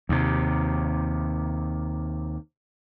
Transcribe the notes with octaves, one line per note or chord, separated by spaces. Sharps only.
D#2 C3